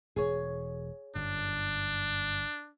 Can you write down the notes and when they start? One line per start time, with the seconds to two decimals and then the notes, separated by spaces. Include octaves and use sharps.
0.16 E1 G#4 C#5
1.15 G1 F#2 D4